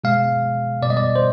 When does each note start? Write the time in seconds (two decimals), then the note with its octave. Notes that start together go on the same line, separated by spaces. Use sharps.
0.04 B2 G#3 F5
0.82 B2 D5
0.87 G3 D#5
0.97 D5
1.16 C5